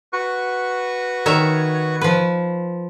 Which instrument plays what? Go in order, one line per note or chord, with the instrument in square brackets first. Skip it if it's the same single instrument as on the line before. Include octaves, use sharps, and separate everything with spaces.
[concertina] F#4 B4 C#6
[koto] D#3 C#5 E5
F3 B4